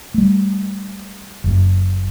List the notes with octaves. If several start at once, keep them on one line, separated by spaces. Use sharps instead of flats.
G3 A3
F#1 F#2